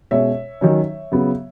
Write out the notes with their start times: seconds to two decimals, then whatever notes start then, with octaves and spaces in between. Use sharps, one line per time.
0.11 B2 G#3 C#4 C#5 E5
0.61 D#3 F#3 C#4
1.12 C#3 F#3 B3